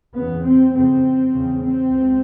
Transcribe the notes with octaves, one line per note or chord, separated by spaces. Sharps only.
E2 C#3 B3
C4
F2 C#3 C4
E2 C#3
C4
C#2